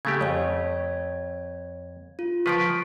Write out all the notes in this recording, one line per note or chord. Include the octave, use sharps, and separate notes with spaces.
C#3 A3 G4 G#6
F2 C#5 G#6
F4
F3 F4 B4 C#6 B6 D7